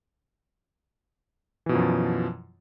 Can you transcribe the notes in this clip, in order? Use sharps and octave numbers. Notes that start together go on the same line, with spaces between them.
F#2 B2 E3 F3